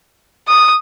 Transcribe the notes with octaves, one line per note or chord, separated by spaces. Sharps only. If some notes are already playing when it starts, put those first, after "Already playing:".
D#6